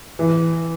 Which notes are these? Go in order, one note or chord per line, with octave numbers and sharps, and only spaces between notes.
E3